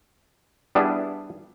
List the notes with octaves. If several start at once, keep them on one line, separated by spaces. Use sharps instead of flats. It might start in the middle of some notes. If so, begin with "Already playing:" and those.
G3 B3 D4 E4 G#4